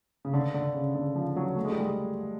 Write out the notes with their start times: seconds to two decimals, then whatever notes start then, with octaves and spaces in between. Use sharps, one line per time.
0.25 C#3
0.33 D3
0.54 D3
0.74 C#3
0.95 D3
1.16 F3
1.36 F#3
1.56 A3
1.65 G#3
1.72 G3
1.80 G#3